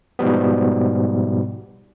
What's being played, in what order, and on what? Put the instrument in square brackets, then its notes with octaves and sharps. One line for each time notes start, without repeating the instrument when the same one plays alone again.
[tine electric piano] G#2 B2 F3 G3 B3